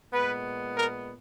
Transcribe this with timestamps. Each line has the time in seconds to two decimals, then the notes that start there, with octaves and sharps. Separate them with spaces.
0.12 A#2 G#3 B3 B4
0.75 A#4